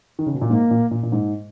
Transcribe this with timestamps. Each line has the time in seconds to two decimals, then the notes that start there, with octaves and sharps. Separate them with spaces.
0.19 D#3
0.26 C#3
0.34 B2
0.41 A#2
0.49 G#2 A#3
0.71 A#2
0.91 A#2
1.03 A#2
1.12 G#2